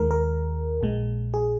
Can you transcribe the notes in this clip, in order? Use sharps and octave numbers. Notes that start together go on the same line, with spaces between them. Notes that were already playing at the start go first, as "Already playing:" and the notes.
Already playing: D#2 D#3 G#3 A#4
A#4
A#1 A#2 G#3
G#4